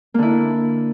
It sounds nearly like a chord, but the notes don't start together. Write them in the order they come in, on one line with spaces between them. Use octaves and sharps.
A#3 D3 E4